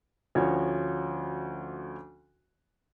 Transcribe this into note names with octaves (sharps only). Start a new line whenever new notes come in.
D2 F3 C#4 F#4 C#5